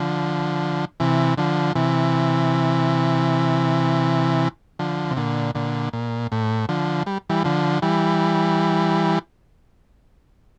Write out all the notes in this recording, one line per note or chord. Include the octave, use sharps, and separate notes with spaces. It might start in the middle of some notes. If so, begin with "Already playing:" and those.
Already playing: D3 F3
C3 E3
D3 F3
C3 E3
D3 F3
C3
A#2 D3
A#2 D3
A#2
A2
D3 F3
G3
E3 G3
D3 F3
E3 G3